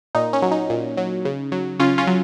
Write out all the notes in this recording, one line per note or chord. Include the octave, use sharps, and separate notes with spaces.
A#2 D#4
C#4
F#3
D#4
A#2
F#3
C#3
F#3
C#3 C#4 F4
C#4 F4
F#3